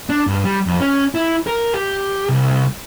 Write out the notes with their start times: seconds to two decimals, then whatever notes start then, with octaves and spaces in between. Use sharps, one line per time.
0.09 D4
0.27 G2
0.45 G3
0.67 F2
0.80 C#4
1.15 E4
1.47 A#4
1.74 G4
2.29 C2